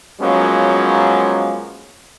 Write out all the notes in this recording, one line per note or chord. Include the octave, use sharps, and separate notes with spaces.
F3 F#3 G#3 A#3 B3 C#4